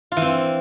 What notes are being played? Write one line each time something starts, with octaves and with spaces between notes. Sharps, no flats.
F4
E3
C4